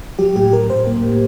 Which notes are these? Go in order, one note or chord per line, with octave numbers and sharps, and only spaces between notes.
F#3 G4
A2 G4
F#3 A#4
A2 C5
A#3
A2